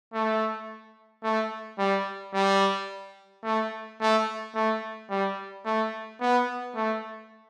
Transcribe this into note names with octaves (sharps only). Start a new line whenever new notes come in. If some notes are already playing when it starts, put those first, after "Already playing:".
A3
A3
G3
G3
A3
A3
A3
G3
A3
B3
A3